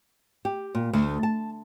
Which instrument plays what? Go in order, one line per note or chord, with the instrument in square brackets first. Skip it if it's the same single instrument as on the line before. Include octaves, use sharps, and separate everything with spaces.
[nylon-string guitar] G4
A#2
D2
A5